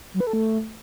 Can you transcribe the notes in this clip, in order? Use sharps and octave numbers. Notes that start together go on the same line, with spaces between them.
F#3
B4
A4
A3